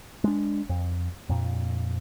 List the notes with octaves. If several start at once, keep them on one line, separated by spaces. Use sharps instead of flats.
G#3 D4
F2
F2 A#2